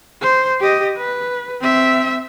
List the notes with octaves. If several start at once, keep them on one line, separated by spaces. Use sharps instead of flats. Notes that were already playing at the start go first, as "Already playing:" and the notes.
C5
G4 D#5
B4
C4 E5